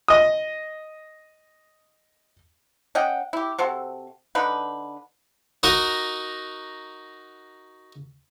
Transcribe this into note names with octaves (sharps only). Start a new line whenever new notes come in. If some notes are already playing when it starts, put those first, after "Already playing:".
D#5 D#6
C#4 D#5 F#5 G5
E4 G4
C3 C4 F#4 A4
D3 D4 D#4 B4
D#4 F#4 A#4